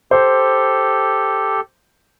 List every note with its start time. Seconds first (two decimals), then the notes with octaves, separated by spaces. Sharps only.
0.11 G4 A4 C5